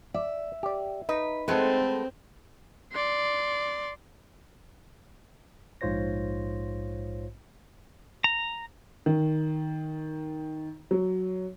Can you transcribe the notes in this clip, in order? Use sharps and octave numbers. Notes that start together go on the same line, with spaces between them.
D5 E5
G4 D5
D#4 B4 D#5
G#3 A3 B3 C4 A4 B4
D5 C6
A#1 G#2 F4 C5 C#5 A#6
A#5
D#3
F#3